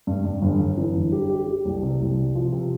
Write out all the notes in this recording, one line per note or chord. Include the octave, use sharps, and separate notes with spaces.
G2
G2
G1
G1
E3
G1
G4
G4
G4
C2
C3
C2
C3
F3
C3